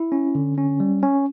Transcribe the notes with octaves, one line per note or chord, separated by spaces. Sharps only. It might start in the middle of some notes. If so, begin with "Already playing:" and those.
Already playing: E4
C#4
D3
C#4
G3
C#4